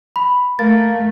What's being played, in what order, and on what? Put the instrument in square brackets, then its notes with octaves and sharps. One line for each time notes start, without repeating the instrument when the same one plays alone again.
[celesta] B5
[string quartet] A3 [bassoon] A#3 [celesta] A6